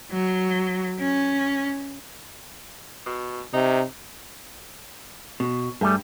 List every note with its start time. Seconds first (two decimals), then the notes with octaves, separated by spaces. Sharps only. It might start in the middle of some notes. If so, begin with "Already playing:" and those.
0.11 F#3
0.99 C#4
3.06 B2
3.53 C3 D#4
5.40 B2
5.81 G2 G3 A3 G#4